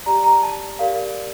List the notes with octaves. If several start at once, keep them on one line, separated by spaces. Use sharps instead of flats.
G4 D5 A#5
A#5
A5
G4 A#4 D5 F5